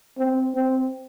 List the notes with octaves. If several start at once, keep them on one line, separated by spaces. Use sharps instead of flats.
C4
C4